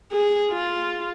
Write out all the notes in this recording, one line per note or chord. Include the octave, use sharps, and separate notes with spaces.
G#4
F4